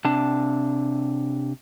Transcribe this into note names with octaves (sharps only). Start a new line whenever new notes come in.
C3 D4 A5